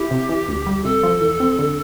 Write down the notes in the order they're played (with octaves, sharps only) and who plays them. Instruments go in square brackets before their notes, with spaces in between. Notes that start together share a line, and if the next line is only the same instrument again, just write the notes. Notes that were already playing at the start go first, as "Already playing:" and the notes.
Already playing: [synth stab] E4 [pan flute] G4
[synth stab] C3
E3
D2
G3
[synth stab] C3 [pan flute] A4
[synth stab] F3
E2
C4
D3